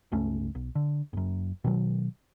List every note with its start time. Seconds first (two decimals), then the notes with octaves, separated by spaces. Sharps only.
0.12 G1 C#2 A3 C#4
0.55 B1
0.75 D3
1.13 F#1 F#2
1.64 B2 D#3 F#3